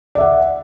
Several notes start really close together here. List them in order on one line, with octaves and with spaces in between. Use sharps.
D5 E5 F#5